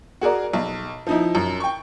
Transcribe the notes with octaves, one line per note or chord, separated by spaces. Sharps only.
F#4 G#4 A#4 D5
B1
F3 D#4 E4
F#2
G5 C#6